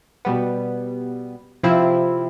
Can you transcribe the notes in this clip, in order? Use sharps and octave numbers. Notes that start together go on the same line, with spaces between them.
B2 G3 B3
C3 F3 C4 E4